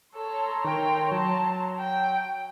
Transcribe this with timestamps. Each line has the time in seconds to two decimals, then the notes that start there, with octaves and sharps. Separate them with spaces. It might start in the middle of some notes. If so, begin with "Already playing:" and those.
0.14 A4 C#5 A#5 C6
0.64 D#3 A#4 G5
1.11 F#3 A5
1.79 G5